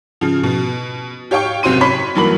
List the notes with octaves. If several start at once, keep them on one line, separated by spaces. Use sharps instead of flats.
C#3 F3
B2
G4 C#5 F5 G5 C#6
F#1 C3 C4 F#4 C6 D#7
C#5 B5 C6 B6
G2 E3 F#3 A#3 B5 F#7